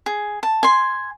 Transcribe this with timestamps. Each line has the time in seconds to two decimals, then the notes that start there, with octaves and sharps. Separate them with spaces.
0.06 G#4
0.43 A5
0.63 G#5 C6